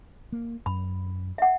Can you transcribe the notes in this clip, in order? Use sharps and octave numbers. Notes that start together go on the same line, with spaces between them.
A#3
F#2 B5
E5 F#5